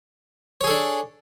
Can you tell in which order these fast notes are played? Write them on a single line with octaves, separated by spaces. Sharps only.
C#5 G#4 A4 D4